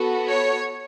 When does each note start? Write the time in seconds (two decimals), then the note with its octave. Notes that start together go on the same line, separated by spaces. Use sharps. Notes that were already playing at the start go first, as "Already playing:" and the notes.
Already playing: B3 F#4 A4
0.26 C#5